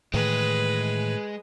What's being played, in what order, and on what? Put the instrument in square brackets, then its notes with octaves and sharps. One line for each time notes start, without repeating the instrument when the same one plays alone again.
[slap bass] A2 D#3 E3 [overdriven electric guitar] G#3 [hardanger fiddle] B4